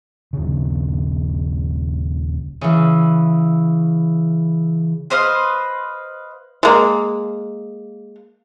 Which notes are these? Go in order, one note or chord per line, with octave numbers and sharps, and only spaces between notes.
D#1 C#3
C#3 E3
B4 C5 D#5 F5
G#3 A#3